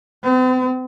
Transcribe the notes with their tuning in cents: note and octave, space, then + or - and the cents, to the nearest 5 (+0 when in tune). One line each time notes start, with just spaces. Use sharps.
C4 -45